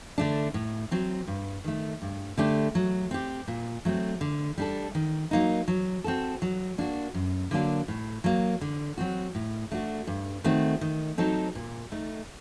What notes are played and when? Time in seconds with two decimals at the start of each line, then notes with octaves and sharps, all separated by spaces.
0.18 D3 A3 D4
0.54 A2
0.91 F#3 C4
1.27 G2
1.64 D#3 A3
2.02 G2
2.38 D3 A3 D4 G4
2.75 F#3
3.11 C4 G4
3.48 A#2
3.85 F#3 A3 C4
4.21 D3
4.58 G3 D4 A4
4.95 D#3
5.31 F#3 A#3 D#4
5.68 F#3
6.04 C4 F#4 A4
6.42 F#3
6.78 A#3 D4 F#4
7.14 F#2
7.51 D3 F#3 A#3 D4
7.88 A2
8.24 F#3 A#3
8.61 D3
8.98 F#3 C4 F#4
9.35 A2
9.71 A3 D4 F#4
10.07 G2
10.44 D#3 A3 C4 F#4
10.81 D#3
11.18 F#3 C4 D#4 A4
11.55 A#2
11.92 A3 D#4